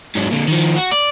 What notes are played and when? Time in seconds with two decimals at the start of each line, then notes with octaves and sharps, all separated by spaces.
0.16 G#2 F#3
0.31 A#2 D3
0.48 D#3 F3
0.76 F#4
0.91 D5